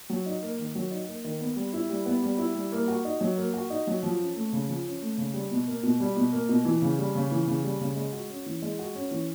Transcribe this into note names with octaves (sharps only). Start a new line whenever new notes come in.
F#3
D#4
A#3
D#3
F#3
D#4
A#3
D#3
B3
G3
E4
G3
B3
G3
E4
G3
A#3
F#4
D#4
F#3
A#3
F#4
D#4
F#3
F3
C#4
A3
C#3
F3
C#4
A3
C#3
G3
B2
A#3
B2
G3
B2
A#3
B2
E3
C#3
G3
C#3
E3
C#3
G3
C#3
G#3
F#4
C#4
E3
G#3
F#4
C#4
E3